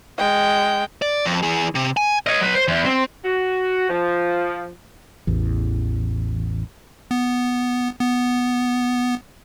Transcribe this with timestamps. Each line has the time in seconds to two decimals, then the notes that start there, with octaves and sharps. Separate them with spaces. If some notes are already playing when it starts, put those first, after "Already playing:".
0.18 G#3 G5
1.02 D5
1.25 F2
1.43 E3 G#4
1.75 C3
1.97 G#5
2.27 C#5 D#5
2.41 F#3 B4
2.55 C5
2.68 E2
2.85 C4
3.25 F#4
3.89 F3
5.27 A1 E2
7.11 B3
8.00 B3